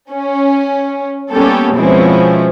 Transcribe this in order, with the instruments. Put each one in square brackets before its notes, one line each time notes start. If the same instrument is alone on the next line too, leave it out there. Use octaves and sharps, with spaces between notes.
[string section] C#4
G3 A#3 B3 C#4 G4 A4
B2 F3 G#3 C4 C#4 E4